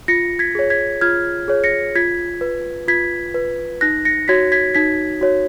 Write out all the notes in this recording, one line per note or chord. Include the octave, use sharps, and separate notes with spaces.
F4 A#6 C#7
G#6 B6
G#4 C#5
G#6 B6
F4 F6 G#6
G#4 C#5
A#6 C#7
F4 G#6 B6
B4
F4 G#6 B6
B4
D#4 F#6 A#6
A#6 C#7
F#4 C#5 G#6 B6
G#6 B6
D#4 G#6 B6
F#4 C#5